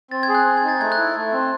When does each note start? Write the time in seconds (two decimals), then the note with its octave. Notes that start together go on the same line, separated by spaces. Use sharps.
0.11 C4 A6
0.23 G#6
0.29 G#4
0.35 F#6
0.46 C4
0.57 G#6
0.63 D#4
0.69 A6
0.80 A3 G#6
0.92 F#6
0.98 E4
1.16 A3
1.32 C4